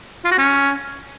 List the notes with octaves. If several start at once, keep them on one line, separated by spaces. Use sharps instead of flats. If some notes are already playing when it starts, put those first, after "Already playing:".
F4
F#4
C#4